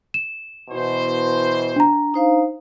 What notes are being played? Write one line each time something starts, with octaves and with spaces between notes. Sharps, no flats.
E7
B2 E3 C5
D4 A#5
D#4 C5 F5